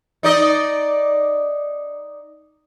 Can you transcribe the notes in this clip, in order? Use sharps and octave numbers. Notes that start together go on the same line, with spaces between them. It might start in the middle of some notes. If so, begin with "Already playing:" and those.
D#4 D5 D#5